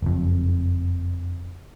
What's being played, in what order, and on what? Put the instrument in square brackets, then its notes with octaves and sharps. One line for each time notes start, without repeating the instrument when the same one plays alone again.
[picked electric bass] F#1 F2